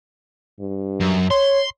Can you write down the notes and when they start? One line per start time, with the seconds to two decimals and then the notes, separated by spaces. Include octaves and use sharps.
0.60 G2
1.00 F#2
1.31 C#5 C6